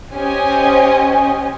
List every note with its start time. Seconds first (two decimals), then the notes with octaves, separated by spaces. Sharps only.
0.13 C#4 G4 C5 D#5 G#5